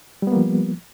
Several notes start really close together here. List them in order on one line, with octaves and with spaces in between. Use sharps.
G3 B3 A#3 F3